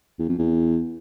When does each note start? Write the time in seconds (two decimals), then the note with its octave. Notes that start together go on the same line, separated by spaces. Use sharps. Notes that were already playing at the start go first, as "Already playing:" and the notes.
0.19 E2
0.29 F2
0.39 E2